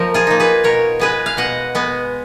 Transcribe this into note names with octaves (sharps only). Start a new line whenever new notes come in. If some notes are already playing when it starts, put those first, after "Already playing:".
Already playing: F3 A#3 D#4 A#4
F4 G#4
A#3 D#4
G#4 B4
B2 A#4 C#5
G#3 B3 G#4 B4
F5
B2 D#5 F#5
G#3 B3